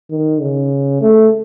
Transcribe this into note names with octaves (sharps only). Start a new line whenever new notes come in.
D#3
C#3
A3